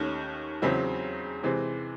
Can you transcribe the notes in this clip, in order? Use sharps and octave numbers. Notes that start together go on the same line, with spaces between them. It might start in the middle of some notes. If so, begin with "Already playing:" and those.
Already playing: D#2 D#3 A3 C#4
E2 C#3 F#3 C4 E4
C3 E3 G#3 C4